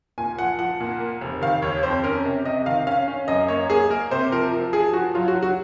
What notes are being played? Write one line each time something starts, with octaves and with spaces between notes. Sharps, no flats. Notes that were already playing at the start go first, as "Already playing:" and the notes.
A#2 G#5
F3 F#5
F3 F#5
A#2
A#3
F1
D#3 F5
D#2 C#5
F2 C5
C#4 A#4
C3
C3 D#5
D#3 F5
C#4 F5
C#4
F#2 D#5
A#3 C#5
A#3 G#4
A#3 A#4
C3 C5
F3 A#4
F3
F3 G#4
F3 F#4
F#3 F4
F#4
F#3
F#4